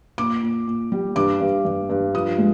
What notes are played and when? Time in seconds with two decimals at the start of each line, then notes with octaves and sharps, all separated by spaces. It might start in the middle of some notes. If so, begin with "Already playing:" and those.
0.18 A#2 D6
0.43 A#2
0.67 A#2
0.92 G3
1.16 G2 D6
1.41 G2
1.65 G2
1.90 G2
2.14 F3 D#6
2.38 G#3